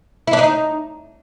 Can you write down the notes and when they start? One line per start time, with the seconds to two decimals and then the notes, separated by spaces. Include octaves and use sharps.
0.27 E4
0.33 D4
0.39 D#4